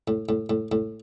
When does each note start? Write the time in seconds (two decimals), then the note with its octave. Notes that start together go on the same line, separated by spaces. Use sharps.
0.08 A2
0.29 A2
0.50 A2
0.72 A2